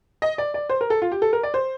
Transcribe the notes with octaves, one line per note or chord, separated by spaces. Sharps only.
D#5
D5
D5
C5
A#4
A4
F4
G4
A4
A#4
D5
C5